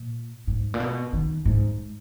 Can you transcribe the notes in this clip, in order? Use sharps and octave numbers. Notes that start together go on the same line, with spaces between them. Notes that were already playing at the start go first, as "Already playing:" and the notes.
Already playing: A#2
G#2
A#2
B2
D#3
G#2